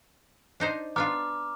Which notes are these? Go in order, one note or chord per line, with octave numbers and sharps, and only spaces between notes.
D4 D#4 C5
B3 D4 F4 A#5 D6 F6